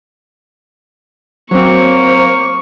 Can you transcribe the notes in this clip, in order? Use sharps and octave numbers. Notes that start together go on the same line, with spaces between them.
F#3 A#3 C4 C5 C#6